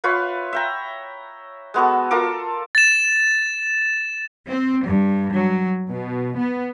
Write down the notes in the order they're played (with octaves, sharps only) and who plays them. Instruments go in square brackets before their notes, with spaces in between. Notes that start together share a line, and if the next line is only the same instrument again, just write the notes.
[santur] F4 B4 C#5 E5
E5 G5 A#5
G#3 B3 F#4 A4
F4 A4 A#4 D6
[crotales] A6 E7
[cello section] C4
G2
F#3
B2
B3